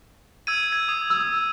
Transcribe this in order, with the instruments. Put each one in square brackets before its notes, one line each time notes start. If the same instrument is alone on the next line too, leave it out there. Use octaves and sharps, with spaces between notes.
[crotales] E6 G#6 D#7
G#6
D#6
[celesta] E6